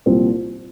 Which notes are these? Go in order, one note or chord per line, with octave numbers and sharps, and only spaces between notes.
C2 A#2 F3 C4